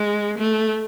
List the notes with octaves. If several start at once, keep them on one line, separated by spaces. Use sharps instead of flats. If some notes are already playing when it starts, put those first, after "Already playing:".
Already playing: G#3
A3